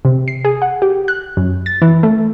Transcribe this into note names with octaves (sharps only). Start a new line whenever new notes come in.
C3
C7
G#4
F#5
G4
F#6
F#2
A6
E3
A3